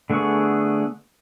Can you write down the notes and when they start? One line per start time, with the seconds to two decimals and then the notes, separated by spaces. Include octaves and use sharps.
0.10 D3 A3 B3 G#4 C#6